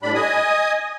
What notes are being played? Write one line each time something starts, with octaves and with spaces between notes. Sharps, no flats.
A2 G3 D4 B5
D#5 G#5 D#6